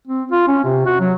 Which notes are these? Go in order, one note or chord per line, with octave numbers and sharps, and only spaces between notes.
C4
F4
C#4
C3
F#4
F#3